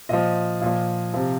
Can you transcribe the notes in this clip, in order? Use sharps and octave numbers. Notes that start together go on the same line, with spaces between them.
A#2 F3 D#5
A#2 F3
C3 F3